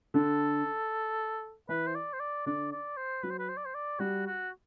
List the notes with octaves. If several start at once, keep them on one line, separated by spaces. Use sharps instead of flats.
D3 A4
E3 B4
C5
D5
C5
D5
D3 D5
D5
C5
F#3 B4
C5
B4
C5
D5
C5
D5
G3 F#4
F#4